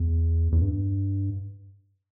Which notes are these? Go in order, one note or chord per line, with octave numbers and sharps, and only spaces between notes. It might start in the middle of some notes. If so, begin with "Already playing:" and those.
Already playing: E2
E2
G2